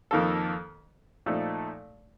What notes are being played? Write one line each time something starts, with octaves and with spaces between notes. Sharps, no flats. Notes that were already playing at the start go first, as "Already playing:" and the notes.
F2 D#3 A#3 F4 A4
A#2 F3 A3 D#4 A4